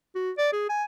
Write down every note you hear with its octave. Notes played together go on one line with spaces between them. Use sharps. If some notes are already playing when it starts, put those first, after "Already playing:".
F#4
D5
G#4
G#5